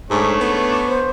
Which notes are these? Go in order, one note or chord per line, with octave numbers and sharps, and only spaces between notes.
G#2 A3 D4 C#5
B3
C5